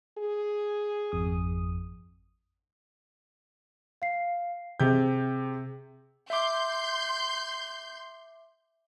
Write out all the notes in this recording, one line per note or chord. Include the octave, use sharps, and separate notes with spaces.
G#4
G#1 F2 D#6
F5 C7
C3 G#4 G5 G6
E5 C6 D6 G6